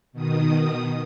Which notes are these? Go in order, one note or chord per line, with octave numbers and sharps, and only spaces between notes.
B2 D#3 D#6